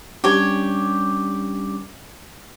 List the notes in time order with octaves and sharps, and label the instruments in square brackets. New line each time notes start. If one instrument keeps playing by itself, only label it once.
[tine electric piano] G3 C#4 D4 [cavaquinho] G4 C#5